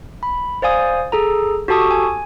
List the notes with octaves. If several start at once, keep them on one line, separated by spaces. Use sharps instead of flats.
B5
C5 D5 F5 G#5 D#6
G#4 A4 A#5
F#4 G4 A4 A5 C#6 D#6
G#5